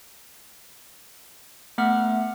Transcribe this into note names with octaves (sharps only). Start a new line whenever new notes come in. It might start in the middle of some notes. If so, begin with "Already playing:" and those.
A3 B3 E5 F#5 F6